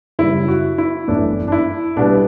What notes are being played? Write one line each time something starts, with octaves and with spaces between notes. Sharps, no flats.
F#2 C#3 G3 E4
F#4
E4
G1 F#2 E3 A3 D4
D4
E4
B1 B2 G3 B3 D4